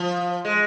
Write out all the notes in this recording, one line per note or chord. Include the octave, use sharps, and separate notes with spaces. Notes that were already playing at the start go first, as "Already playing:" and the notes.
Already playing: F3
G#3